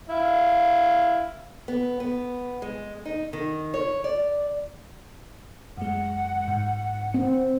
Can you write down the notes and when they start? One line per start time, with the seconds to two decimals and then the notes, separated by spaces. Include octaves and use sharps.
0.09 E4 F5
1.68 B3
2.00 B3
2.62 G#3
3.05 D#4
3.33 D#3
3.74 C#5
4.04 D5
5.77 F#2 G#3 F#5
6.48 G#2
7.14 C4